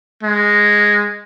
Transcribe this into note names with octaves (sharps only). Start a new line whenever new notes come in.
G#3